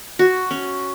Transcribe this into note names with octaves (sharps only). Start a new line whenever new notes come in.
F#4
C#4